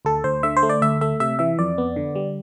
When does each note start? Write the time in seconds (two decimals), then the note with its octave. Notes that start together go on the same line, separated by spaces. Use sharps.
0.05 D2 A4
0.24 D2 C5
0.43 D3 E5
0.57 C5
0.63 A3
0.69 D5
0.82 D2 E5
1.01 A3 E5
1.20 C3 E5
1.39 E3 E5
1.59 F2 D5
1.78 B3
1.96 D3
2.15 G3